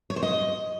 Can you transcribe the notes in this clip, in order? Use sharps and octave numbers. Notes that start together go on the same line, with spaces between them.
C#5
C5
D#5